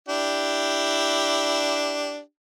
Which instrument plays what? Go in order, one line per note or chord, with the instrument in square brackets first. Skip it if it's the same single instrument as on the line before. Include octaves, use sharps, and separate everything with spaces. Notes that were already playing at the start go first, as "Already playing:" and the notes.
[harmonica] D4 E4 G4